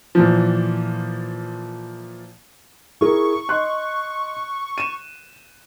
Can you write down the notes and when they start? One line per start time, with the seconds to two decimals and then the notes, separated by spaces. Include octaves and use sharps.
0.15 A#2 E3 F3
3.01 E4 G#4 A#4 C#6
3.49 D#5 C6 F#6
4.78 D#7 E7